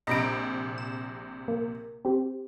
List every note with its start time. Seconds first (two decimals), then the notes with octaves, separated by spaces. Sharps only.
0.07 A#1 C3 D#5 A#5 B5 D7
0.78 E7
1.48 A#3
2.05 C4 G4